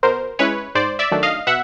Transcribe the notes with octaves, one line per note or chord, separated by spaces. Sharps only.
B2 A#4 C5
G#3 C#4 E4 B4 C#5
G#2 C5 D5
D5 E5
D#3 F#3 A3 D4
D#5 F5
B2 E5 F#5